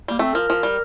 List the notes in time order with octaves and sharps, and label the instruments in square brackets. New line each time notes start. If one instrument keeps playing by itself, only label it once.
[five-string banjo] G3 [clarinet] A#3
[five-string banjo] A3 [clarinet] C4
[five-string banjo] F3 [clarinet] A#4
[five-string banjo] F3
G3